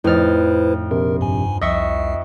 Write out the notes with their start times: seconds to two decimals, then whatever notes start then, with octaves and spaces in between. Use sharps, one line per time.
0.04 F2 A2 D#4 E4 B4 C5 F6 A6
0.91 A#1 C3 A#4
1.21 G2 G#5
1.62 C2 F2 D#5 E5 C#6 C#7